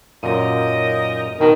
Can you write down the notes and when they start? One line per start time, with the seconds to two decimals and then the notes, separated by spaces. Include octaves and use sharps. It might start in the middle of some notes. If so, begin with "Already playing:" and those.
0.23 F#2 A#2 D#4 A#4 D#5
1.40 B2 D#3